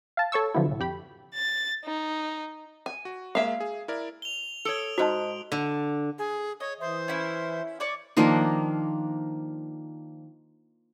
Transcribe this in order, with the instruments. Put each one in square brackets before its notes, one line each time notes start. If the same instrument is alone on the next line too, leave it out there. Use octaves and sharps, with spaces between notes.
[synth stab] F5 A5
A4 C#5 C#6 E6
D3 F3 F#3 B3 E4
C2 A2
F2 G4 B5
[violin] A6
D#4
[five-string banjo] G#5
[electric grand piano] F#4
[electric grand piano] G#3 A#3 [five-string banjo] E5 F5
[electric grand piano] G#4
E4 A#4 D5
[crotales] F7 G7
[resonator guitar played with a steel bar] A4 C#5 [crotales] D#6 D7 G7
[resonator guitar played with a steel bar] G#2 A#5 [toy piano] F#4 [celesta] C5 D#5 A5
[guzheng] D3
[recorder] G#4
[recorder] C#5 [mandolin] D#5
[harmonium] E3 E5 [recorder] C5
[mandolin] C#4 E4
C#5 D5 C#6
[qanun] D#3 F3 A#3 D4